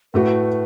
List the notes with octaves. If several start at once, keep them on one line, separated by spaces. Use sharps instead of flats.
A2 A3 F#4 B4